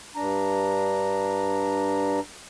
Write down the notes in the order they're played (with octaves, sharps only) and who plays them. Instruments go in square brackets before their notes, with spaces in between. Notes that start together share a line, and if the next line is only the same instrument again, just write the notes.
[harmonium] G2 D4 A#5